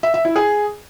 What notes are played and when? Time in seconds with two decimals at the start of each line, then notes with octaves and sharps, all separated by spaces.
0.03 E5
0.14 E5
0.25 E4
0.36 G#4